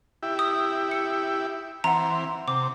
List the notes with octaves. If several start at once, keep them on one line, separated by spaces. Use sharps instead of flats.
E4 G4
D#6
C#7
E3 C4 F#5 A#5
C3 D6